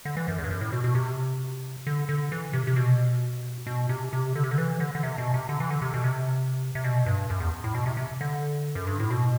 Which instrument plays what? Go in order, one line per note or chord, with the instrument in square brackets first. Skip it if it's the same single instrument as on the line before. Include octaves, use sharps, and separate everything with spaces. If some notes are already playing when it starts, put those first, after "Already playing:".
[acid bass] D3
E3
F#2
E2
G2
F#2
A2
B2
B2
C3
D3
D3
E3
C3
C3
B2
B2
C3
C3
D3
C3
D3
E3
D3
D3
C3
B2
C3
D3
E3
D3
C3
B2
C3
C3
B2
G2
F#2
E2
A2
B2
C3
C3
D3
F#2
G2
A2
B2